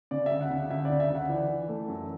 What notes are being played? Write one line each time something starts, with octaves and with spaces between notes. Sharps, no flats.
C#3 D5
D2 E5
F#5
C#3
F#5
D2 E5
D5
C#3
E5
D2
F#5
E3 D5
E3
A3
F#2